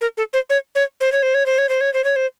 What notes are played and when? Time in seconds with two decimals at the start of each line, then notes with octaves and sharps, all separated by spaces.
0.01 A#4
0.17 A4
0.33 C5
0.50 C#5
0.75 C#5
1.01 C5
1.12 C#5
1.23 C5
1.34 C#5
1.46 C5
1.58 C#5
1.69 C5
1.81 C#5
1.94 C5
2.04 C#5
2.16 C5